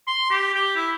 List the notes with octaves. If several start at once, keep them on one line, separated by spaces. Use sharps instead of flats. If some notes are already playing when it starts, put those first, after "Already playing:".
C6
G4
G4
E4